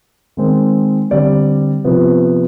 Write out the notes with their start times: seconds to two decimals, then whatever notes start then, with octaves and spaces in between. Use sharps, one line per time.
0.37 D#3 G#3 C4
1.11 D3 G3 C4 D5
1.85 C3 F3 B3